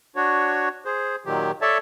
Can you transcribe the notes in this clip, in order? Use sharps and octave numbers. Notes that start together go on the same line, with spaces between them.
D4 F#4 C#5
G#4 C5
A#2 D#3 F#3 G4
A4 C#5 D5 E5 A5